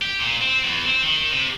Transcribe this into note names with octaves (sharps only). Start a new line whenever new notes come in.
G4
A#2
C4
E2
C4
D#3
C3